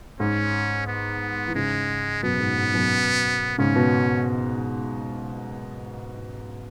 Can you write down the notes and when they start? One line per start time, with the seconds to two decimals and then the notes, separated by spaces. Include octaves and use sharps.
0.20 G#2 C#4
0.87 B3
1.48 E3
1.55 G#2 C#3 G#3
2.23 F#2 B2 B3
2.40 G#2
2.57 G#2
2.74 F#2 B2
3.58 G#2 C#3 C#4
3.75 B2